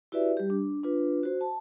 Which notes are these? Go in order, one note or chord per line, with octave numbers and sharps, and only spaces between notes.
E4 F#4 G4 B4 D5 E5
G3 G4
D4
D4 F4 B4
F#4 C5
A5